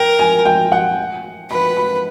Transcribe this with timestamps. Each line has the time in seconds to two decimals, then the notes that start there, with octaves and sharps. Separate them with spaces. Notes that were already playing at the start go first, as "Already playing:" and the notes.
Already playing: A#4 G5
0.19 G#5
0.45 G5
0.72 F#5
1.50 B4 B5
1.77 B5